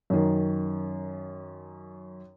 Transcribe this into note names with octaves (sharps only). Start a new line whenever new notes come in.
F#2 D#3